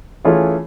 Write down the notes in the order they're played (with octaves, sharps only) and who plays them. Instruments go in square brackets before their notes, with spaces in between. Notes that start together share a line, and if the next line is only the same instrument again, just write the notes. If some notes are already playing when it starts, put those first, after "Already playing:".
[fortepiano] E3 A3 C#4 F4 G#4